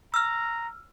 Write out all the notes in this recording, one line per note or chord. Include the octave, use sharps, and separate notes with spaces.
A#5 E6 F6